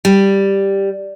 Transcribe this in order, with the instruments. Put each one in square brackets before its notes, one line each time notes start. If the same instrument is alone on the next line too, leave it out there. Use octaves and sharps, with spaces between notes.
[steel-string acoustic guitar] G3